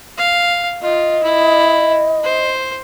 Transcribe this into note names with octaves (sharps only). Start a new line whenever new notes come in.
F5
F4 D#5
E4
C5